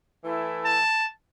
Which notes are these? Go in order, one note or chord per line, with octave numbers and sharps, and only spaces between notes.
E3 A3 E4
A5